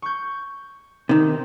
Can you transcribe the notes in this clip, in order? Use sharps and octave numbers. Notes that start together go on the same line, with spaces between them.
C#6 G6
C3 D#3 D#4